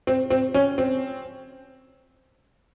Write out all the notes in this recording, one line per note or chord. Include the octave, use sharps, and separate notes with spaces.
C4
C4
C#4
C4